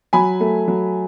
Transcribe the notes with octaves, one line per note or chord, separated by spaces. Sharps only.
F#3 G#5 B5
A3
F#3